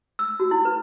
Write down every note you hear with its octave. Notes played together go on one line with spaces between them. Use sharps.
E6
F#4
E4
B4